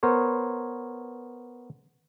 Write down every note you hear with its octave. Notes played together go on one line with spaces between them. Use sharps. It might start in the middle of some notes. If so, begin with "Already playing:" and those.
B3 A#4 C5 C#5